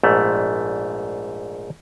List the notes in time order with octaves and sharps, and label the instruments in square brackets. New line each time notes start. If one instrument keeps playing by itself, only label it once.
[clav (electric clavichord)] A#1 G#2 A3 B3